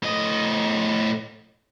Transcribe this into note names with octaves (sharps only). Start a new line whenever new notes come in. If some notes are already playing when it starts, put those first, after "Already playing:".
A2 D#5